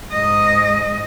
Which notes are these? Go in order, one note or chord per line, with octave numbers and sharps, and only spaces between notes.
G#2 D#5